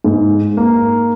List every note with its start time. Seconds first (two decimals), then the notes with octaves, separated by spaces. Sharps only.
0.04 G#2
0.57 A#3